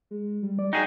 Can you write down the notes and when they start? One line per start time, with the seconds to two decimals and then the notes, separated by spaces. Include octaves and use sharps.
0.11 G#3
0.43 G3
0.59 D5
0.73 D#4 F#4 G#4 G5